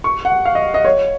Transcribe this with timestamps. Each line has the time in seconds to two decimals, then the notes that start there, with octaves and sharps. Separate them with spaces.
0.04 C#6
0.25 F#5
0.45 F5
0.55 D#5
0.74 D#5
0.85 C#5